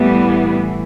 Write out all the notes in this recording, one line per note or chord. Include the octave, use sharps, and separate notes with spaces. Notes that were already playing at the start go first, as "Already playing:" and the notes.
Already playing: A2 E3 G3 B3